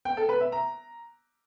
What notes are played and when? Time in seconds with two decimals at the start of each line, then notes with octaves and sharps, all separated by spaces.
0.05 G5
0.17 A4
0.29 B4
0.41 E5
0.52 A#5